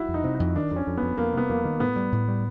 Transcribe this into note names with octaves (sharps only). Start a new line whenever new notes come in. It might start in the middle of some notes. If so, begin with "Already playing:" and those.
Already playing: E4 F#4
F2
D#4
C3
F2 D#4
D#3 D4
F2 C#4
F2
B3
F2
F2 A#3
C3 B3
F2 A#3
D#3
A2 B3
G3
A2
G3